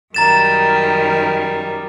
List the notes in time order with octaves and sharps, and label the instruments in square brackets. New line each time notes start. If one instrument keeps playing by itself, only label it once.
[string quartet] F#2 D#3 G3 [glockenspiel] A#5 A6 E7